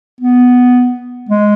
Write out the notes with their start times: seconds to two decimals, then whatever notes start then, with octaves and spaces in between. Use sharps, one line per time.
0.21 B3
1.29 G#3